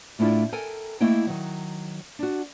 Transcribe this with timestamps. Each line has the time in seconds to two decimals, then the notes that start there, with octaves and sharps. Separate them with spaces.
0.19 A2 A3 D4 E4 F4
0.52 A4 A#4 G5 G#5
1.00 A3 A#3 E4 D#5 G5
1.27 D#3 F#3
2.19 D4 F#4